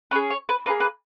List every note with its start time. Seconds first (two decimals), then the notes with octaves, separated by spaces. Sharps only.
0.11 C#4 G#4 B4
0.30 C#5
0.49 B4
0.66 A#3 D#4 G#4 B4
0.80 B4